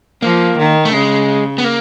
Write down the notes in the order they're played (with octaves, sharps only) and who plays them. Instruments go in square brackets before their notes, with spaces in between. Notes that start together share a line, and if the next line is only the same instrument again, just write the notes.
[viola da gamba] F3 [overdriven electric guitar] A#3
[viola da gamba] D#3
[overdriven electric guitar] A3
[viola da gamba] C#3 [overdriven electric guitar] G#3
[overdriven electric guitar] B3
A#3